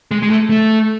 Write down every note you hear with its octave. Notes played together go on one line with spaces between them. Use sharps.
G#3
G#3
A3
A3